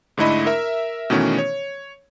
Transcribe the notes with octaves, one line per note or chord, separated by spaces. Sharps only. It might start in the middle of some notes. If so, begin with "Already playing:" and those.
G#2 D3 A3 E4 D#5 B5
A#4 E5
B2 D#3 E3 A3 B3 C#4
C#5